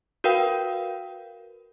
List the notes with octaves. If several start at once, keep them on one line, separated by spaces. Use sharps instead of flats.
F#4 A#4 B4 F5 G5